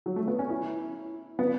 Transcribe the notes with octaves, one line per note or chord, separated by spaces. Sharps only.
F#3
A3
B3
C#4
E4
B3